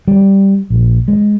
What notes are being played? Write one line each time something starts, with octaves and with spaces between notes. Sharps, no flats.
G3
A#1
G#3